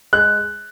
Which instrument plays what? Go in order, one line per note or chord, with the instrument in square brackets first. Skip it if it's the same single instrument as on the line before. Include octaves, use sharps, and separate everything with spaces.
[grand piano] G#3 F#6